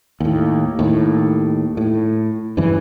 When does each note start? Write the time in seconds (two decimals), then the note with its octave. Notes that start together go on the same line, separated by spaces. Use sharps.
0.20 D#2 A2
0.79 D#2 A2
1.77 A2
2.57 E2 G2 C#3 E3